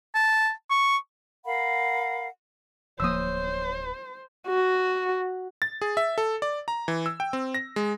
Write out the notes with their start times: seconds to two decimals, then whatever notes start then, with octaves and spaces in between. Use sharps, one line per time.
0.14 A5
0.70 C#6
1.45 A#4 F5 F#5 B5
3.00 D1 F3 A#3 C5 C#5 D#6 E6
4.48 F#4
5.62 A6
5.82 G#4
5.97 E5
6.18 A4
6.42 D5
6.68 A#5
6.88 E3
7.06 E6
7.20 G5
7.33 C4
7.54 A#6
7.76 G#3